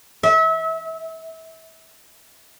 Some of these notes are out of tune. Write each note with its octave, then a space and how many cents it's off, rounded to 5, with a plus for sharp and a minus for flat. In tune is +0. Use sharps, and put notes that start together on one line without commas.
E5 -30